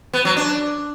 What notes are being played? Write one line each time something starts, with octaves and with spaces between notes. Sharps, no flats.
B3
F#3
D4